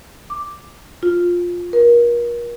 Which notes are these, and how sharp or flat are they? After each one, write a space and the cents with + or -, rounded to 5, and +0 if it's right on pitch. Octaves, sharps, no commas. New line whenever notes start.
D6 +0
F4 +10
A#4 +35